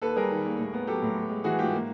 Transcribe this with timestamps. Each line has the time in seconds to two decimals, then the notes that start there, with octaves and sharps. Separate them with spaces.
0.02 D#2 A4 B4
0.16 G3 G#4 A#4
0.31 D#3
0.45 D#2
0.59 A2
0.73 B3
0.87 F#3 G4 A4
1.02 A2
1.16 B3
1.30 G#3
1.44 E3 F#4 G#4
1.59 G#2 F4 G4
1.73 A#3